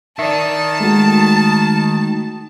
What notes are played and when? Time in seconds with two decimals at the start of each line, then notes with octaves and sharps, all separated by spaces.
0.19 D#3 D5 E5 A5
0.80 G#3 A3 F#4